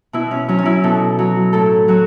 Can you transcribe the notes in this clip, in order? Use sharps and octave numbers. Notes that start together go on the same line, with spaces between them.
B2 E4
C#4
F#3 C#4
C#4
E4
B2 A4
F#3
A2 A4
F#3 F#4